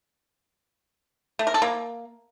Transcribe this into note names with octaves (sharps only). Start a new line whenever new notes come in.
A3
A#4
A4
A#3